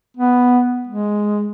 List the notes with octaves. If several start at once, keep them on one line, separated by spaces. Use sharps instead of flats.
B3
G#3